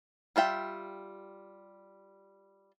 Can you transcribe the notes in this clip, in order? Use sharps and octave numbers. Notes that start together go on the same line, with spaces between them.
G3 F4 E5 G5